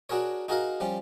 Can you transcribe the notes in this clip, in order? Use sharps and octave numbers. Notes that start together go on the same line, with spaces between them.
D4 F#4 G#4 A#4 C#5
D#4 F#4 G#4 A#4 D#5 F5
F3 G3 C#4